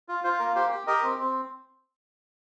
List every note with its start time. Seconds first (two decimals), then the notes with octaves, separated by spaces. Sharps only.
0.08 F4
0.24 F4 C5
0.39 A#3 A#4
0.55 G4 C5
0.71 G4
0.87 G4 A#4 D#5
1.03 C4
1.19 C4